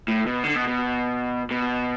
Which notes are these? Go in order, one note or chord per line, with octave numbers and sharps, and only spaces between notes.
A2
B2
D3
B2
B2
B2